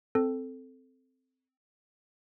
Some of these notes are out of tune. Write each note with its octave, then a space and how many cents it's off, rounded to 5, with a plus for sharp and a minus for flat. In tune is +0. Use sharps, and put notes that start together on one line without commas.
C4 -10 A4 +0